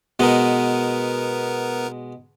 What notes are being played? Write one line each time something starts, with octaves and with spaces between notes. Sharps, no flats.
B2 G#3 B3 A#4